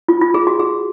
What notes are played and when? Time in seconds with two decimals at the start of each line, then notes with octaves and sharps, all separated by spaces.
0.08 F4
0.22 F4
0.34 G#4
0.47 F#4
0.60 G#4